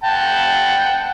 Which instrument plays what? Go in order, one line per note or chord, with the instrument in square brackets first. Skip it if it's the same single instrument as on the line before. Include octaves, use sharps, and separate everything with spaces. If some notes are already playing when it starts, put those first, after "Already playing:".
[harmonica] F#5 G5 A5